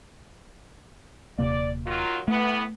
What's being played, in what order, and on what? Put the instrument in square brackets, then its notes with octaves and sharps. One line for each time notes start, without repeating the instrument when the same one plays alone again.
[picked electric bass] D#1 C3 A#3 [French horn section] D5
[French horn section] D#3 F#3 F4
[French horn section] A2 E3 B3 [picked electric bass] A3